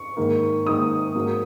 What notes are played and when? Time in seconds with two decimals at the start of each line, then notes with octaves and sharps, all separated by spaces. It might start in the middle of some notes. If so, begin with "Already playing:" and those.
Already playing: C#6
0.17 G#2 D#3 A#3
0.66 G#2 D#3 A#3 D#6
1.15 G#2 F#3 A#3